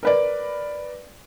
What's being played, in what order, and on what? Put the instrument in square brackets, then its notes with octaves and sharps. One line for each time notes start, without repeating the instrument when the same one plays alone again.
[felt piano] A#4 B4 D5